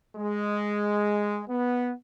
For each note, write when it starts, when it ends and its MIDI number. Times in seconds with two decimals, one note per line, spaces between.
0.16 1.42 56
1.49 1.93 59